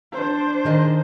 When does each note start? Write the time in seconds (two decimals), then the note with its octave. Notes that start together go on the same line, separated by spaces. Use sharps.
0.13 D4 C5
0.65 D#3 G#4 D#5